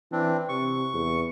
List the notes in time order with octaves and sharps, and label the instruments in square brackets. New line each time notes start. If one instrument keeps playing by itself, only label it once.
[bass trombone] E3 [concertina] C4 D4
[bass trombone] C3 [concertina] C#6
[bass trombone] E2